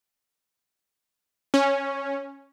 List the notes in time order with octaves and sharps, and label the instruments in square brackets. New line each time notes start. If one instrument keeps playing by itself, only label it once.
[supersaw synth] C#4